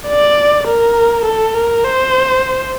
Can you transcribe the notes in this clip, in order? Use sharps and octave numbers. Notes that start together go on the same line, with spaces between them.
D5
A#4
A4
A#4
C5